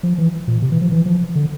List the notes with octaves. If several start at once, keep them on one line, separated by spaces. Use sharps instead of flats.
F3
E3
A#2
C3
E3
F3
E3
F3
D3